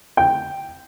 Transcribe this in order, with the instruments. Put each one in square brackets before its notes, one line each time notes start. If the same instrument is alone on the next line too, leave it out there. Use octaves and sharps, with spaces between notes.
[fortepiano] G5